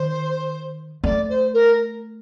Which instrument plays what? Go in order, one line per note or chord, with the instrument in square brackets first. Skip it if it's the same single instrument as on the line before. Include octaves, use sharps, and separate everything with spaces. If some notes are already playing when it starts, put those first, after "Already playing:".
Already playing: [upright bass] D#3 [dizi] C5
[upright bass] A3 [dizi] D5
[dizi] C5
A#4